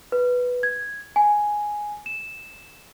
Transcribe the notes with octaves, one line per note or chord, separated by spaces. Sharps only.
B4
G#6
G#5
E7